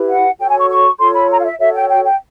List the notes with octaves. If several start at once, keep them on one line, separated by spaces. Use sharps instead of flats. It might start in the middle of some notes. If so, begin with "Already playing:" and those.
Already playing: E4 G4 B4
F#5
F#4 A4 C#5 G5
G#5
C#6
C#6
F4 A4 C#5 C6
B5
A#5
F5
E5
F#4 A4 C#5 E5
G5
G5
G5